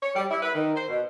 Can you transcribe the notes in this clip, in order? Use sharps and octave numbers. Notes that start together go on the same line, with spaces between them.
C#5
G3
E4
B4
D#3
C5
B2